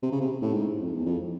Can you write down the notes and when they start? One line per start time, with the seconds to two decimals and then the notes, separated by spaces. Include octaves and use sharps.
0.02 C3
0.12 C#3
0.21 C3
0.42 A2
0.53 G#2
0.80 F2
0.93 E2
1.06 F2